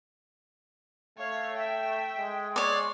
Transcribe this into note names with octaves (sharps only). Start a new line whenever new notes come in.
A3 C#5 F5
E5 G5
G#3
C#5 D5 C6